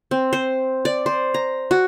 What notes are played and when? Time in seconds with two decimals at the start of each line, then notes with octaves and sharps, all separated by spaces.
0.11 C4
0.33 C5
0.85 D5
1.06 C5
1.34 A#5
1.71 F#4